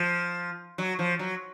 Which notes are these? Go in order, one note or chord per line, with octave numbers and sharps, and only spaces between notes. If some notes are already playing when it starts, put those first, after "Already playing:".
Already playing: F3
F#3
F3
F#3